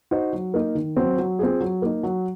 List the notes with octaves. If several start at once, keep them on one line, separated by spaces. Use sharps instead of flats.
D#4 F#4 C5
F#3
A#3 D#4 A#4
D#3
F#3 C4
F#3
C4 F4 G#4
F#3
A#3 D#4
F#3